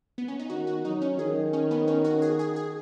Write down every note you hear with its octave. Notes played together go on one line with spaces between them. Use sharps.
B3
C#4
D#4
D#3 F#4
F#4
F#3 D#4
C#4
D#3 G#4
C#4
B3
C#4
F#4
G#4
G#4
G#4